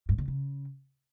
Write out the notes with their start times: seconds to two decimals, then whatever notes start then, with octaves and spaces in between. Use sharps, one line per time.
0.09 G2
0.18 D3
0.28 C#3